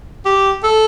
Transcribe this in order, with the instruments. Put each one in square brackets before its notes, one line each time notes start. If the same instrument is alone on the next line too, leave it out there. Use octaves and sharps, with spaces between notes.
[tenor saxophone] G4
A4